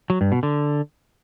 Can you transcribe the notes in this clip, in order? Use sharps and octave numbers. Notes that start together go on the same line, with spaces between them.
F#3
G2
B2
D3